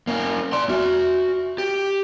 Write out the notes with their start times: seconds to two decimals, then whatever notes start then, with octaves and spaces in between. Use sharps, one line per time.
0.07 A#3 C#4
0.53 D5 C6
0.69 F#4 E5
1.58 G4